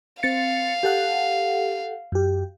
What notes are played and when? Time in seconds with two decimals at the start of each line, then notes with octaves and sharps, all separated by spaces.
0.23 C4 F5 A6 C#7
0.83 G4 A4 F#5
2.12 F#2 G4